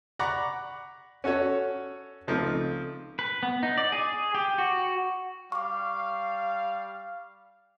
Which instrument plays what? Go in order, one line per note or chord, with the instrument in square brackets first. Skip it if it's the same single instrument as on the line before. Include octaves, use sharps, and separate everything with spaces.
[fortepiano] D5 F#5 A#5 B5 C#6 D6
C#4 F#4 A4 C#5
C#2 F3 A3 C4 D#4
[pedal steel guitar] B4
B3
D#4
D5
G#4
G4
F#4
[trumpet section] G3 F5 [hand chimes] C#6 D6